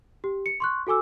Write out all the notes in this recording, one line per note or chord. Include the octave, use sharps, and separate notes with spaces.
G4
C#7
C6 C#6 F#6
F#4 A4 G#5 D6 E6